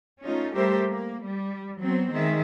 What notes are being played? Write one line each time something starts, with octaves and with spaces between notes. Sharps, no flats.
A3 C#4 D#4 F4
G3 A3 G4 A#4 C5 E5
A#3
G3
F#3 B3 C4
D#3 G#3 E5